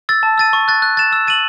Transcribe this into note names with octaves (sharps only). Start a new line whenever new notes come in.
E6 A6
A5
E6 A6 D#7
C#6
F#6 A6
F#6
A6 E7
E6
A6 D#7 F#7